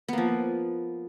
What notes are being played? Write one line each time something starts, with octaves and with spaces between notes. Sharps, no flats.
F3 A#3 B3